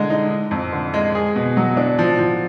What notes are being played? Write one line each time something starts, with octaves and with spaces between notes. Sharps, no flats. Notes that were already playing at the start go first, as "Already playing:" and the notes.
Already playing: D3 G#3
D#4
D#4
F2
D3
G#3
G#4
B2
F#3
D4
F3
F3